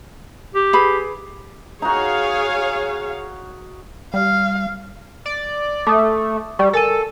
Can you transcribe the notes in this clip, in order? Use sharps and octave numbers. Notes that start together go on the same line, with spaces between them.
G4
G#4 B4 B5
D#4 F#4 G#4 C#5 F5
G3 F5
D5
A3 D6 D#6
G3 D5 C#6
A4 A#4 G#5 D#7